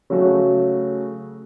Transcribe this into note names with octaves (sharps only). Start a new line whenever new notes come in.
C#3 F#3 A3 F#4